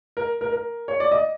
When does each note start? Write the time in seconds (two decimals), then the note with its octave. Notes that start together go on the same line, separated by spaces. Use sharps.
0.17 A#4
0.41 A#4
0.52 A#4
0.88 C#5
1.00 D5
1.12 D#5